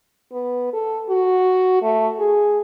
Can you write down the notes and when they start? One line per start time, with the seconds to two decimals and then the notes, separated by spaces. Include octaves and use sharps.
0.33 B3
0.73 A4
1.09 F#4
1.82 A3
2.19 G#4